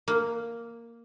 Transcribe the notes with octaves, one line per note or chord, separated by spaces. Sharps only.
A#3